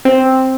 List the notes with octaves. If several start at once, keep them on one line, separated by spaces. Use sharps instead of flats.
C4